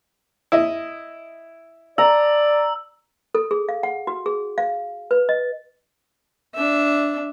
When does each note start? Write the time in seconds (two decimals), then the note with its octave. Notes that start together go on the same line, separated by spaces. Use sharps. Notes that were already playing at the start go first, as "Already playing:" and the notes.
0.52 E4 D#5
1.98 D5 A#5 E6
3.35 A4
3.51 G#4
3.69 F5
3.83 F#5
4.07 F#4
4.26 G#4
4.58 F5
5.11 B4
5.29 D#5
6.55 D4 E5